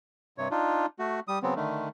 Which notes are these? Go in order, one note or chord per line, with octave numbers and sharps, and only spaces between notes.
G2 C3 C#5
D4 D#4 F4
A3 F#4
G3 D#6
C#3 F#3 B3 C4
D3 D#3 A3